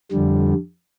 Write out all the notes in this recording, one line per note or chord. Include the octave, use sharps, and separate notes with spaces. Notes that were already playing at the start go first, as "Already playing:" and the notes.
F2 D3 G3